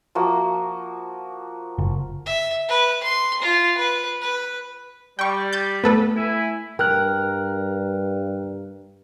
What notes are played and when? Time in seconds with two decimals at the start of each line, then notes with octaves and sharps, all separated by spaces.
0.15 F3 A#3 F#4
1.78 F#1
2.26 E5
2.69 B4
3.03 C6
3.42 F4
3.77 B4
4.21 B4
5.19 G3 G5 C#6
5.53 G6 A6
5.84 A3 B3 A4 B4
6.16 E4 E5 G#5
6.79 G2 A#4 G5 F6 F#6